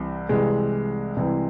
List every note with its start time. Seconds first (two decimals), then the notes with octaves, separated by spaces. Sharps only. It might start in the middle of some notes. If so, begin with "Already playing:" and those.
Already playing: C2 C3 E3
0.29 C2 C3 E3 G#3
1.16 C2 C3 E3